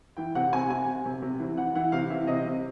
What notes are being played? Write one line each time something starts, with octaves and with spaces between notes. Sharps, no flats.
E3 G5
C3 F#5
C3 G#5
C3 G#5
C3
C3
C3
E3
E3 F#5
E3 F#5
C3 F5
E3 E5
C3 D#5
C3